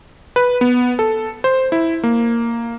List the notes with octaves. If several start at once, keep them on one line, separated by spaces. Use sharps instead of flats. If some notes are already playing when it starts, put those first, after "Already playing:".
B4
B3
A4
C5
E4
A#3